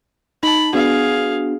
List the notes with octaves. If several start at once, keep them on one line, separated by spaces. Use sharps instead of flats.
D#4 A5 B5
B3 D4 F#4 G#4 F5